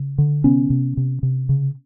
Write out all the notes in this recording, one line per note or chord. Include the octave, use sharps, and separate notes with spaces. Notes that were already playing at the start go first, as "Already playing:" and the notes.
Already playing: C#3
D3
C3 B3 C#4
C3
C3
C3
C#3